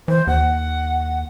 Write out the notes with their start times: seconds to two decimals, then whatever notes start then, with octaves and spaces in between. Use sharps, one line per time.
0.08 E3 C5
0.27 D#2 F#5